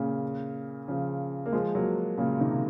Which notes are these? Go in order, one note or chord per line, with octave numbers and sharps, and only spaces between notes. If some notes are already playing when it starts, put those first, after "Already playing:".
Already playing: A#2 C#3
C#3 F3
A#3
F3 G#3
F#3 A#3
A#2 C#3
C3 D#3